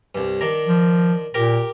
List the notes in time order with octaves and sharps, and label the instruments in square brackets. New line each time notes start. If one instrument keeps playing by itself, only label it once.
[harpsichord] C2 G2
D#3 D4 A#5
[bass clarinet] F3
[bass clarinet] A#2 [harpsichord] G4 A#4 A#5